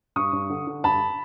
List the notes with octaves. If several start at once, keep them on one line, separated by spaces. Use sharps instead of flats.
G2 C#6 D#6
G2
D3
D3
G2 A5 B5